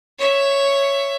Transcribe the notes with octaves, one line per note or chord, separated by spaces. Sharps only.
C#5 E5